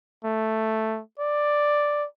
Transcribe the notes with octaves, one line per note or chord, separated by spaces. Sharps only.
A3
D5